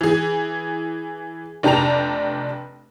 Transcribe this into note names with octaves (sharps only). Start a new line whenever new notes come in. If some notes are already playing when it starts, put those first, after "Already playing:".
E3 G#4
F1 D4 G4 A5 A#5 F7